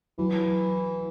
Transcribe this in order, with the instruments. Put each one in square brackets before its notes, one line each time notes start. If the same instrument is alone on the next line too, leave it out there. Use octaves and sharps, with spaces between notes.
[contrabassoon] E3 [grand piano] F#3